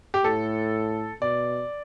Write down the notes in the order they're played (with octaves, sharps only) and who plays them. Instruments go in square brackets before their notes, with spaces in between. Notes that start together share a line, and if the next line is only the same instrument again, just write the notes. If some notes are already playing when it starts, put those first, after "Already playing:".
[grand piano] G4
[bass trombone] A2 [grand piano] A4
[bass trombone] B2 [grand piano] D5